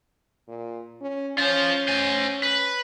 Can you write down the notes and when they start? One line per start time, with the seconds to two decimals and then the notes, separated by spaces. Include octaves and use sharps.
0.48 A#2
1.01 C#4
1.38 C#4 F4 C5
1.88 C5 G#5
2.43 B4